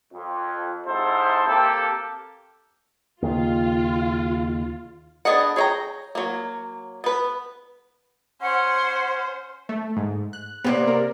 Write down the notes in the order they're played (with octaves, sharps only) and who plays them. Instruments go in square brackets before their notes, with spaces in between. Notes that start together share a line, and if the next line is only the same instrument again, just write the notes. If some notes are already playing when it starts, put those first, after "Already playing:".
[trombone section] F2
G#2 C3 E4 A4 C5
A#3 C4 G4 A4
[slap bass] D#2 C#3 [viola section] F4
[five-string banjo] B3 D4 G#4 D#5 F#5
G#4 C#5 D#5 G5 A#5
F#3 A#3
B3 B4
[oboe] C#4 [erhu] C5 [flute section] F#5
[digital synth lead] A3
G#2
F#6
[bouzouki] C3 A#3 D5 [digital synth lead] B3
[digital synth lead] A#4